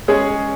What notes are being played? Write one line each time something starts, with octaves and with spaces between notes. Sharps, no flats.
G#3 C#4 G#4 C#5